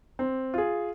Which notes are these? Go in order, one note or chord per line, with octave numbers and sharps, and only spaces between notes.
C4
F4 G#4